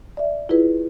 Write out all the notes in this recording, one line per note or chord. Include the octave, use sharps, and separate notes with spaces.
D5 E5
E4 F4 G#4 B4